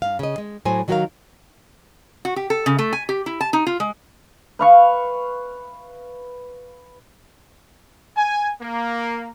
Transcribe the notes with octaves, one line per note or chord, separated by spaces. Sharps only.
G2 F5
C#3 D#5
G#3
A2 F#3 C5 G#5
D#3 F#3 F#4 A4 A#4 F5
F#4
G4
A4
C#3
A3
G#5
G4
E4
A5
D#4
F4
G#3
B4 F5 C#6
G#5
A#3